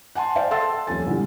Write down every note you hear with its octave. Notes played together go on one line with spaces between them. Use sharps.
F#5 G#5 A5 C6
C5 D5 E5 F5 G5
A4 F#5 A5 C6 E6 A6
D#1 F2 F3 C#4 G#5 A6
A#2 D3 E3 G3 G#3